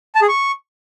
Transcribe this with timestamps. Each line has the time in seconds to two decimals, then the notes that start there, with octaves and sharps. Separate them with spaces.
0.15 A5
0.22 G#4
0.29 C#6